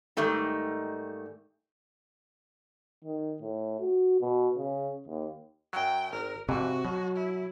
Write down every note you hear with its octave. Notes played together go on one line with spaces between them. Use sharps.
G#2 D#3 G3 A3 D#4
D#3
A2
F#4
B2
C#3
D#2
F#2 F#3 G5
G#1 A#4
F2 G#2 C3 E3 F#4
B2 F#3
E4